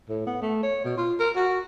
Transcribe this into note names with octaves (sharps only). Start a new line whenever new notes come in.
A2
B3
A3
C#5
B2
F4
A#4
F#4